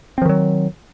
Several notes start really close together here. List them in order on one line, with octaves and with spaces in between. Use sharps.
C4 F3 D#3 F#3